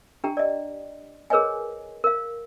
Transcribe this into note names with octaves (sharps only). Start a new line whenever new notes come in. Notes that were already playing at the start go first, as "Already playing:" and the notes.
D4 G4 G5 A#5
D5 D#5
G#4 A#4 B4 C#5 D#5 G#5
A#4 F5